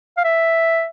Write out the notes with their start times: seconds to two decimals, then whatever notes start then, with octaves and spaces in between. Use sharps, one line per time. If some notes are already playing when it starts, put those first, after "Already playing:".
0.17 F5
0.24 E5